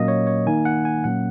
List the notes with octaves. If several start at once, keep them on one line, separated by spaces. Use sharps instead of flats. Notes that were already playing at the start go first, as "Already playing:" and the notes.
Already playing: A#2 F#3 A#3 C#4 D#5
C#5
C#5
D#3 A#3 D#4 G#5
F#5
G#5
A#2 F#3 A#3 C#4 F#5